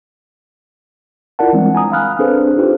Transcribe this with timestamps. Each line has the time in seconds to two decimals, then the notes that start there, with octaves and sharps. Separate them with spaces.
1.39 E4 F4 A#4 D5 F#5 A5
1.53 E3 G3 G#3 C4 D4
1.75 G#5 A#5 D#6
1.92 F5 B5 F6 F#6
2.19 C4 D4 G#4 A4 B4 C5
2.57 D#4 F4 G4 C5